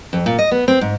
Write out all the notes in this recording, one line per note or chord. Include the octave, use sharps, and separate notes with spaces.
F2
A#2
D#5
B3
C4
G#2